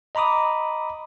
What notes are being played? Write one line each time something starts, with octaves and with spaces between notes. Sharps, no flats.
D#5 A#5 B5 D6 D#6